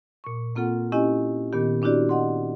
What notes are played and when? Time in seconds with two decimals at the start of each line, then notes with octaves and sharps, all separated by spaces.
0.24 A#2 C#6
0.56 A#3 C4 F4 A4 F#5
0.92 C4 C#4 E4 G4 D#5 G#5
1.53 A#2 D#3 B3 G4
1.82 C4 D4 E4 F#4 G4 D5
2.09 D#5 F#5 C6